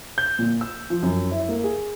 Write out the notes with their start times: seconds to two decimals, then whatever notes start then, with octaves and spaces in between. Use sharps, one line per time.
0.18 G6
0.39 A#2
0.61 E6
0.90 F3
1.03 F#2
1.32 E4
1.49 A#3
1.64 G#4